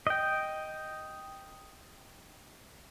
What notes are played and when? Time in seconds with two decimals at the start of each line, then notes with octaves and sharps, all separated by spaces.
0.07 D#5 G5